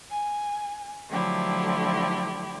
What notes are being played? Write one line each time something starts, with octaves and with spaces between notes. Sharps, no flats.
G#5
D3 F3 F#3 A3 E4 G4